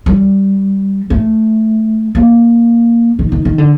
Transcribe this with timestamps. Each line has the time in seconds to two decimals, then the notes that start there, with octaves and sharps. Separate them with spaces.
0.06 G3
1.10 A3
2.15 A#3
3.19 D#3
3.32 D#3
3.45 D#3
3.58 D3